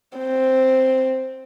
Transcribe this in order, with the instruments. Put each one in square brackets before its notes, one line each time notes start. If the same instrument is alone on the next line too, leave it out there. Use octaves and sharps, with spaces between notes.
[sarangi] C4